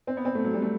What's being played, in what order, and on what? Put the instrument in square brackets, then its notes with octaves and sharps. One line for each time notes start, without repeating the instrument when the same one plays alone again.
[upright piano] C4
B3
C4
A3
F#3
G3
A3